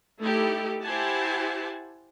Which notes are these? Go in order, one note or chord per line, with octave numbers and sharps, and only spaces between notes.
A3 D#4 E4 G4 A4
E4 G4 C5 F#5 G#5 A5